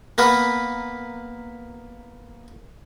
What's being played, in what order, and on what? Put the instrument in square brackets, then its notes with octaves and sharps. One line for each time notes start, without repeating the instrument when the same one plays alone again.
[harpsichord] A#3 B3 B4